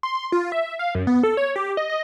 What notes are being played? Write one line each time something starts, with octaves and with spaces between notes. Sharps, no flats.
C6
F4
E5
F5
F#2
B3
A4
C#5
G4
D#5
D#5